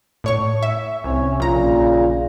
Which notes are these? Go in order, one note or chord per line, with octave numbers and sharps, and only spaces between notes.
A2 C#5 C#6
E5
C2 C#4 C#5
A#1 A#2 C#3 A#5